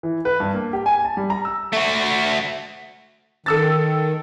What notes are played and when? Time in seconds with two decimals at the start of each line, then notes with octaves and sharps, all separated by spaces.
0.03 E3
0.25 B4
0.40 G2
0.54 A#3
0.73 G4
0.86 G#5
1.04 A5
1.17 G3
1.30 A#5
1.45 E6
1.73 A3 F#4
3.46 D#3 A4 E6 A6